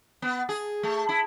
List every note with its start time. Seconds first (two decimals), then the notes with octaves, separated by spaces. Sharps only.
0.22 B3
0.49 G#4
0.83 A3
1.09 E4